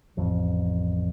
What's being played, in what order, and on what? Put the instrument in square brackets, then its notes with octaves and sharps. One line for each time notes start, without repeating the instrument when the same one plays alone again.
[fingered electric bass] A1 F2